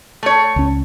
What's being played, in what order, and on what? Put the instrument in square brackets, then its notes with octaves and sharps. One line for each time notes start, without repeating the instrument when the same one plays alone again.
[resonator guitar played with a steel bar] A3 C#5
[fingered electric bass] C#2 C#4